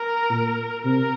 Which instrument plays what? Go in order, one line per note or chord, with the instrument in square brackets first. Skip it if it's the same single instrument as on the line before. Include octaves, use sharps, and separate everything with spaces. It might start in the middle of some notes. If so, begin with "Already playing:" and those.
Already playing: [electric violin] A#4
[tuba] A#2
[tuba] C3 [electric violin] A#4